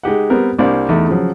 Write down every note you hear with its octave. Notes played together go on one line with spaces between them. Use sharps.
G#3 D#4 G4 F#5
G3 B3 C4 A#4
C2 A#3 C4 D4 D5
E2 A3 D#4
C#3 F3 F#3